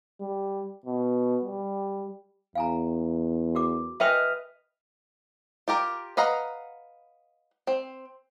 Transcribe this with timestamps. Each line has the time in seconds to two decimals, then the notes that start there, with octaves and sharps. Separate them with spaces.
0.21 G3
0.86 B2
1.44 G3
2.55 E2 F5 G#5 A#5
3.55 F#4 A#4 D6
4.00 B4 D#5 E5 G5 G#5 F6
5.68 F4 G4 A#4
6.17 B4 D#5 F5 F#5 A#5
7.67 C4